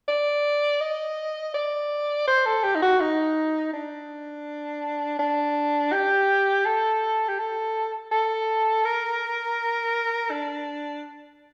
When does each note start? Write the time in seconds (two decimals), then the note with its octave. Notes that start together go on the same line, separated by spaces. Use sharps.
0.08 D5
0.80 D#5
1.54 D5
2.27 C5
2.45 A4
2.63 G4
2.75 D#4
2.82 F#4
3.00 D#4
3.73 D4
5.19 D4
5.92 G4
6.65 A4
7.28 G4
7.39 A4
8.12 A4
8.85 A#4
10.31 D4